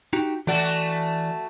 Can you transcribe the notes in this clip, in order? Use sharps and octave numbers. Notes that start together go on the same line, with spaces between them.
D#4 F#4 G4
E3 A3 F#4 D5